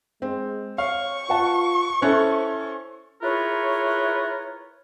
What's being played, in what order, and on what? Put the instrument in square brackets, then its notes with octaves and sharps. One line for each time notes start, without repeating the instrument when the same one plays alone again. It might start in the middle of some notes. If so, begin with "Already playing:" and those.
[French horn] G#3 [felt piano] C4
[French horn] C#5 [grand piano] F5 [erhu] C#6
[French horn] F4 [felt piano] B4 F#5 A5
[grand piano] C#4 E4 A4 [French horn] C5 [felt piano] F#6 C#7
[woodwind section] E4 F4 G#4 A#4 B4 C#5